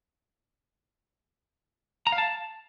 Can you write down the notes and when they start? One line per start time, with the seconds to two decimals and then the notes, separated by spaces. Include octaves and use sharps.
2.07 A#5
2.12 F5
2.18 A5